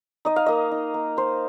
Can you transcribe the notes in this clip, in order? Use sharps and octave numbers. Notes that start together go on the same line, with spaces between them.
D#4 D#5
F5
A#3 D#5
D#4
A#3
D#4 C5